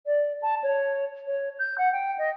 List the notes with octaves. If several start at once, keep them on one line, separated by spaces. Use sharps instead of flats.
D5
A5
C#5
C#5
G6
F#5
G5
D#5